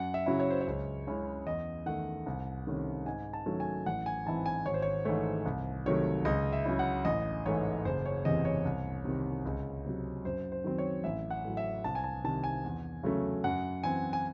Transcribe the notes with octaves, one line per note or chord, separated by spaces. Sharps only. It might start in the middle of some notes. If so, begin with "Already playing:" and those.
Already playing: F#2 F#5
E5
C#3 F#3 C#4 E4
C#5
C5
C#5
C#2
C#3 G#3 C#4 E4
E2 D#5
D#3 A3 F#5
C2
C3 D#3 A3 C#4
G#2 G#5
A5
D#3 F#3 A3 C#4
G#5
A1 F#5
G#5
G#2 E3 C4 E4 A5
G#5
G#1 C#5
C5
C#5
G#2 E3 A3 C#5
C2
C3 D#3 F#3 A3 C#5
C#2 D#5
E5
C#3 F#3 C#4 E4
F#5
A1 D#5
G#2 E3 A3 C#5
F#1 C5
C#5
E2 C3 E3 D#5
C#5
C2
C3 D#3
C#2
C3 F#3
F#2 C5
C5
D#3 F#3 C4
C#5
A1 E5
F#5
A2 F#3
E5
C2 A5
G#5
A5
C3 D#3 A5
G#5
E2
C#3 F#3 A3 C#4
F#2 F#5
E3 C4 G#5
G#5